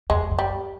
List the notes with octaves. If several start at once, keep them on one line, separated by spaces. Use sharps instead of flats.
F2 G#3
F#2
G3